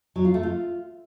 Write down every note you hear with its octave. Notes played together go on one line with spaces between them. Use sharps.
F#3
F4
A3
F4